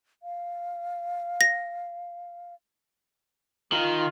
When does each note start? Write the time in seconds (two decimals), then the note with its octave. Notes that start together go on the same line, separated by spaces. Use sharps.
0.23 F5
1.41 A#6
3.72 D#3 F4